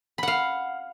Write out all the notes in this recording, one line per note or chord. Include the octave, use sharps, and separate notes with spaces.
F5 F#5 B5